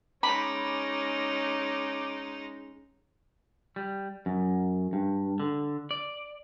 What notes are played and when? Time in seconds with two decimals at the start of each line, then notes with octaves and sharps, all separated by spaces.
0.23 G#3 C#4 D#4 B5 D6
3.76 G3
4.26 F#2
4.93 G2
5.40 D3
5.91 D5